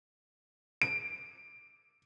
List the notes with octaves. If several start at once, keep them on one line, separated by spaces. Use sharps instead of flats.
D7